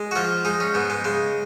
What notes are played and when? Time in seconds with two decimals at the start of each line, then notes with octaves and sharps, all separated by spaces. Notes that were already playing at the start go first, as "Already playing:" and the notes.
Already playing: G#3
0.11 F#4
0.15 F3 F4
0.45 G#3 D#4
0.60 C#4
0.74 G#2 B3
0.90 G#3
1.04 C#3 G#3